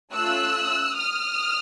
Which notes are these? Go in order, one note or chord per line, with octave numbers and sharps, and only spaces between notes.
A3 C#4 F4 E6 F#6
D#6 F6